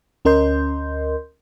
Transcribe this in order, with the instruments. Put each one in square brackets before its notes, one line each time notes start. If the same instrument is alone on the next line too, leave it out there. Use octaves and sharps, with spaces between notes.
[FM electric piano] D2 C#4 A#4 D#5 C6 G6